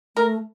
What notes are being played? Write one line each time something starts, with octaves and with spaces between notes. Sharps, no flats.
A3 A#4